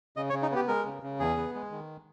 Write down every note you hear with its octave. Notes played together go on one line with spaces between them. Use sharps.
C#3 D#5
C#5
C#3
D#4
B3 G4
G#3 A#4
C#3
C#3
E2 G#4
B3
G#3
D#3